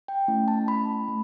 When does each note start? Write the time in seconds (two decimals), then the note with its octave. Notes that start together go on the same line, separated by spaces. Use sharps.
0.08 G5
0.28 A3 C#4 E4
0.48 A5
0.68 B5
1.08 A3